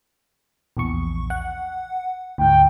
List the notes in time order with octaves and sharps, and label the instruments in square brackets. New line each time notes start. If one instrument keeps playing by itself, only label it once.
[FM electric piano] A#1 E2 C#6
F#5
[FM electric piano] D2 G#2 [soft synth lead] G5